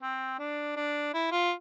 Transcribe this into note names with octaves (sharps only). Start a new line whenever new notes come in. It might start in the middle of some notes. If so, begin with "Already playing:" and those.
C4
D4
D4
E4
F4